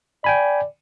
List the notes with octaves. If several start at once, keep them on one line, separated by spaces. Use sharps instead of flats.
D5 G5 G#5 B5